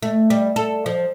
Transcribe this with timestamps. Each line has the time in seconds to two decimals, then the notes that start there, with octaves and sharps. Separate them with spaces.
0.02 A3
0.30 G3
0.56 A4
0.86 F3